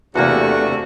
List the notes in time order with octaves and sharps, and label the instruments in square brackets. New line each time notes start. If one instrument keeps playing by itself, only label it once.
[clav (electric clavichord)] E2 A#3 [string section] C3 A3 [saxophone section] D4 F#4